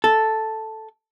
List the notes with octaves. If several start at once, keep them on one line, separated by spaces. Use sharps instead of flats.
A4